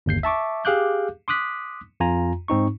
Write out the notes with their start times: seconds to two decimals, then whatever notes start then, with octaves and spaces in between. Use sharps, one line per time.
0.06 G1 D#2 G6 C7
0.23 E5 A5 C#6 D6
0.65 G4 G#4 F5 D6 F#6 G6
1.28 C6 D6 D#6 F#6 B6
2.00 F2 F4 G#5 A#5
2.48 G#2 C4 D#4 C#6